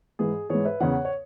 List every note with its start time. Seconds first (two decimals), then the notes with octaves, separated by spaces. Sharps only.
0.19 G#2 E3 G#4
0.49 G#2 E3 G#4 C#5
0.65 B4 E5
0.80 E2 C#3 E3 C#5 F#5
1.05 C#5